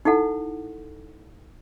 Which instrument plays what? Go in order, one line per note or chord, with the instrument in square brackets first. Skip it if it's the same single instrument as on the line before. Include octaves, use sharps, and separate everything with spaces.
[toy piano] D#4 E4 A4 F#5